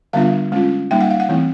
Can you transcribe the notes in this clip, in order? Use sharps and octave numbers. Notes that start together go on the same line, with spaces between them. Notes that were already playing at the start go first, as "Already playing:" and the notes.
D3 G3 B3 D4 F4 F5
G#3 C#4 F4
G3 A#3 D#4 G5
F#5
F5
F#5
E3 A3 C4 E4